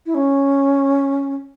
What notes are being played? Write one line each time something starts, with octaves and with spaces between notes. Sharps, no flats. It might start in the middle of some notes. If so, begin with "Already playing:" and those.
E4
C#4